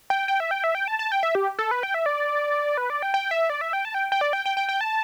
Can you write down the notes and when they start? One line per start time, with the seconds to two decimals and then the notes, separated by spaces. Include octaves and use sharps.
0.10 G5
0.28 G5
0.40 E5
0.51 G5
0.64 E5
0.75 G5
0.88 A5
0.99 A5
1.12 G5
1.23 E5
1.35 G4
1.59 A4
1.71 B4
1.83 G5
1.94 E5
2.06 D5
2.77 B4
2.90 D5
3.02 G5
3.14 G5
3.31 E5
3.50 D5
3.61 E5
3.73 G5
3.85 A5
3.94 G5
4.12 G5
4.21 D5
4.33 G5
4.46 G5
4.57 G5
4.69 G5
4.81 A5